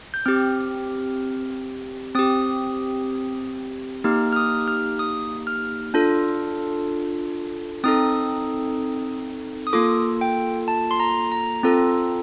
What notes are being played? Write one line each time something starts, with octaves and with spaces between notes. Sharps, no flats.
G6
C4 G4 F6
C4 G4 D#6
A#3 D#4 G4 F6
F6
D#6
F6
D#6
F6
D4 F4 A4
C4 D#4 A4 D#6
D#6
A#3 F4 A4 D6
G5
A5
C6
A#5
A#5
C4 F4 A4